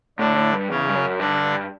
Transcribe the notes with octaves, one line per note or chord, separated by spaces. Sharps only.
A2 D3 D4
A2
G2
E2 C#3 C#4
G2
F#2
G2 D3 D4